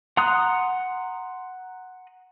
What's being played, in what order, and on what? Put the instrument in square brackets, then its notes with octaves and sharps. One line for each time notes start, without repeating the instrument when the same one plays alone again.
[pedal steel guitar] F#5 A#5 C6 D#6 F#6